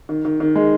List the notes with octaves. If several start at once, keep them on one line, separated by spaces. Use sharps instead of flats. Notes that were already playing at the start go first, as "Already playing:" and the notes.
D#3
D#3
D#3
G#3